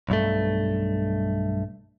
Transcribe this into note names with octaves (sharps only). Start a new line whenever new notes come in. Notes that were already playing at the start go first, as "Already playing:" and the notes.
B1 G2 A3